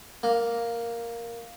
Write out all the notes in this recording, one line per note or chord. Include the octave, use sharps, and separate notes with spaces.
A#3